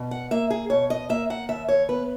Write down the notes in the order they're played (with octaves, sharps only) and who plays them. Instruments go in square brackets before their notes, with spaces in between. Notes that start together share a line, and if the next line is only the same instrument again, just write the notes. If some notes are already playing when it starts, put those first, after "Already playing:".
Already playing: [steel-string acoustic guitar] B2
F#5
A#3 E5
G#4
B2 C#5
D#5
A#3 E5
F#5
D#2 E5
C#5
B3 B4